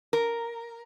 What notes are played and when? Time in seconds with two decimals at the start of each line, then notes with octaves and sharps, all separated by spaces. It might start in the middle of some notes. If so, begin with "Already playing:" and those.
0.13 A#4